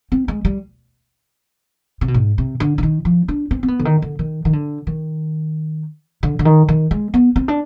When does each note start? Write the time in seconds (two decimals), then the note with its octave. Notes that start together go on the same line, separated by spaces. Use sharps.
0.12 C4
0.28 G#3
0.45 G3
2.01 C3
2.08 B2
2.14 G#2
2.38 C3
2.60 D3
2.78 D3
2.83 D#3
3.05 F3
3.28 D4
3.51 C4
3.63 C4
3.68 B3
3.79 D3
3.85 D#3
4.02 D3
4.19 D#3
4.45 D#3
4.53 D3
4.87 D#3
6.23 D3
6.39 D3
6.45 D#3
6.69 D#3
6.91 G#3
7.14 B3
7.36 C4
7.48 D4